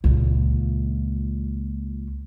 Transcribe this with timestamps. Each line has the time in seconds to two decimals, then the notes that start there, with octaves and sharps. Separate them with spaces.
0.04 C#2 A#2